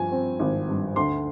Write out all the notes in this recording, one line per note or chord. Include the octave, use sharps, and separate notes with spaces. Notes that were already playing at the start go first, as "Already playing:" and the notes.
Already playing: G2 F3 G#5
C4
G#1
G2
D2 C6